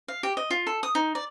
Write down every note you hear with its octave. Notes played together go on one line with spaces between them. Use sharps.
F5
G4
D#5
F4
A4
D#6
D#4
D5